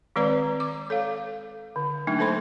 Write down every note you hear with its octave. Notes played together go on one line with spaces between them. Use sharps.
D#3 G#3 C4 B4 D5 A#5
D6
A4 C#5 F5
D3
F#3 A3 A#3 D4 D#4
A#3 A4 C5 B5 C6